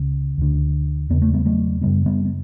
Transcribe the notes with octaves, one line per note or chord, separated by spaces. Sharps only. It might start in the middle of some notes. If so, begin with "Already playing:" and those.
Already playing: C#2 C#3
D2 D3
E2 C#3 B3
A3
G3 B3
F#3 A3
F#2 C#3 G3 B3
G3 B3
B3